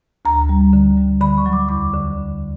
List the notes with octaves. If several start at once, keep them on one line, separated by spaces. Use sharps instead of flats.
D2 A#5
G3
D3
G3
D3 B5
C#6
F#3
D6
E2 D6
D3